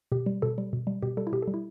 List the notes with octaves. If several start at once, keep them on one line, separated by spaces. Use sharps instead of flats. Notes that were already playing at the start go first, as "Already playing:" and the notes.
B2 G4
G3
B2 A4
G3
B2
G3
B2 G4
G3 A4
E4
B2 G4
A4
G3
E4